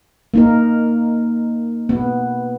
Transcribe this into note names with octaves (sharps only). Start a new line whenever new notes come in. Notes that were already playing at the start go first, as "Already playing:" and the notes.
A#3 D#4 A#4
B3